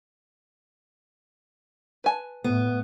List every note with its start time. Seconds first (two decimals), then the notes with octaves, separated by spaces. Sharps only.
2.04 B4 G#5 A5
2.44 A2 B3